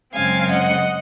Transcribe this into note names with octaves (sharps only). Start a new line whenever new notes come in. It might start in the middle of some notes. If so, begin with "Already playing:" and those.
F#2 C#3 G#3 C4 F5 G#5
D#5 F#5